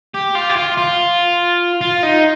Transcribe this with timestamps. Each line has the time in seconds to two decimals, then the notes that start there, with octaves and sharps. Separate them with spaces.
0.15 G4
0.35 F4
0.50 G4
0.56 F4
0.77 F4
1.81 F4
2.03 D#4